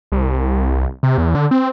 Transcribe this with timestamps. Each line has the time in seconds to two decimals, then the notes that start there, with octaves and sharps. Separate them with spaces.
0.12 C2
1.03 C3
1.18 E2
1.35 D3
1.51 C4